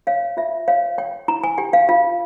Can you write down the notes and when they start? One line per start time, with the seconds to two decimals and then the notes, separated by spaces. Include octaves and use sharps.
0.07 C#5 F5
0.37 F4 E5
0.68 C#5 F5
0.98 C#5 G5
1.28 E4 A#5
1.44 G#5
1.58 G4 G5
1.73 F5
1.89 F4 F5